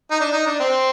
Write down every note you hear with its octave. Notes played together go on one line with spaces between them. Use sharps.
D#4
D4
D#4
D4
C4